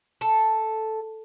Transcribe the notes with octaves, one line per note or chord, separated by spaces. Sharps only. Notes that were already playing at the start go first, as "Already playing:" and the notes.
A4